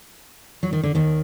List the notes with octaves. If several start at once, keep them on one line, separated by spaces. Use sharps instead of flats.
F#3
D#3
D3
D#2 D#3